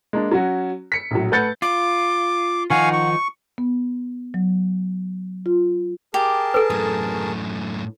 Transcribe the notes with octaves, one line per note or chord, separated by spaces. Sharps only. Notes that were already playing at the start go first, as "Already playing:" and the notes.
G#3 A#3 D4
F#3 C#4 F#4
B6 C#7
A#1 A2 F#3
A3 B4 F#5 G6 A6 C#7
F4 D6
D#3 F3 D#4 F5 F#5 G#5 C#6
C#6
B3
F#3
F4
G4 G#4 A#4 A5
A4 B4
F#2 A2 D#6